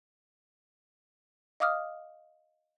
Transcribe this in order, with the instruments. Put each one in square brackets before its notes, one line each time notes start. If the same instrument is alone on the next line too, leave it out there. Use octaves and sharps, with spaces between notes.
[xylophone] D#5 F5 D6 D#6 F6